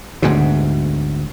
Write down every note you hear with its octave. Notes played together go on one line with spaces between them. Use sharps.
D2 G#2 B2